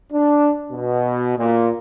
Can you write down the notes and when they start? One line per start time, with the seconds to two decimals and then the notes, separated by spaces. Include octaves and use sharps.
0.13 D4
0.72 B2
1.38 A#2